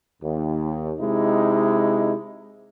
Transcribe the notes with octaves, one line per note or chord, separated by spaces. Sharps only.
D#2
C3 G#3 D#4 E4